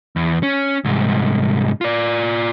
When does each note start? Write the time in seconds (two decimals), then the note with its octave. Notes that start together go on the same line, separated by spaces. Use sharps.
0.16 E2
0.43 C#4
0.85 C2 G#2
1.81 F4 D5